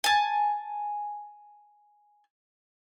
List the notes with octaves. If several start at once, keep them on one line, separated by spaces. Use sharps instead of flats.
G#5 A5